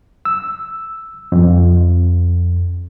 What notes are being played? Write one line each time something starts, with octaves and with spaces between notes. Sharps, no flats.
E6
F2